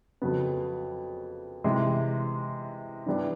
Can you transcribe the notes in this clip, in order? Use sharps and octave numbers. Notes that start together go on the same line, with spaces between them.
F2 C#3 F#3 B3
C3 E3 G#3
G2 E3 G3 B3 D4